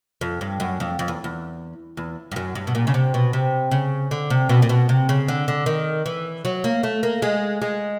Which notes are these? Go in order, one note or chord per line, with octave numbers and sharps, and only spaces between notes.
F2
G2
F#2
F2
F2
E2
E2
E2
G2
F#2
G2
B2
A#2
C#3
C3
B2
C3
C#3
D3
C3
B2
A#2
B2
C3
C#3
D3
D3
D#3
E3
F#3
A#3
A3
A#3
G#3
G#3